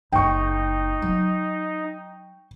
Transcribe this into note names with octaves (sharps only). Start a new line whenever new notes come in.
F#1 D#4 E4 G5 C#6
F#3